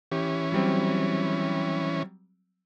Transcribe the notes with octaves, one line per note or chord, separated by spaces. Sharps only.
E3 C#4 G4
F#3 G3 C4